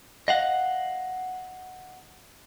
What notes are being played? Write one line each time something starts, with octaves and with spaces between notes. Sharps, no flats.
D#5 F5 F#5